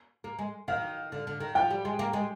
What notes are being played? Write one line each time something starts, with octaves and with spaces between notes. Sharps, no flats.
A#3
G#3
D#3 F5
D3
D3
D#3
F3 G5
G3
G#3
A#3
G#3